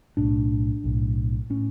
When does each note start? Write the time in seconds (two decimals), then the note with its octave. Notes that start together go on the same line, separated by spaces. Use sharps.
0.17 B1 A2 D4
0.84 B1 A2
1.50 A2 C#4